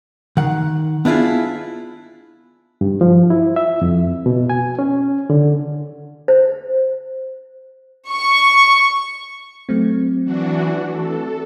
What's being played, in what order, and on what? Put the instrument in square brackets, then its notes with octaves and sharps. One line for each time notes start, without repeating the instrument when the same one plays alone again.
[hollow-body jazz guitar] D#3 F#5
B3 D4 E4 F4 G#4
[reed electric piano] G2
F3
E4
E5
F2
B2
G#5
C#4
D3
[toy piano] C5
[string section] C#6
[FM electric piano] F#3 A3 C4
[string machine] E3 D4 F#4
A4